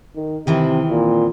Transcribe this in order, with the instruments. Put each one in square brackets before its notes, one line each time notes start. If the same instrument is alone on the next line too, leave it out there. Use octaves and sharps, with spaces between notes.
[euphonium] D#3
[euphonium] C3 [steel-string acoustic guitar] D#3 E3 C4
[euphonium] A#2